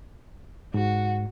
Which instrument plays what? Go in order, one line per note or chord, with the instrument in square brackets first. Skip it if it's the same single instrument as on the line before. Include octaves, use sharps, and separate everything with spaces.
[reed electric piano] G#2 [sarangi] F#4